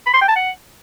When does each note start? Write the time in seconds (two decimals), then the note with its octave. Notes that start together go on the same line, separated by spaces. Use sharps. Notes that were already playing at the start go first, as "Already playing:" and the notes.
0.06 B5
0.14 C6
0.21 G5
0.28 A5
0.36 F#5